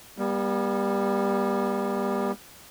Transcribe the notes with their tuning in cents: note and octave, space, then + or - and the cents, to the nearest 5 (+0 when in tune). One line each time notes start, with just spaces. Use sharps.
G3 +20 B3 -40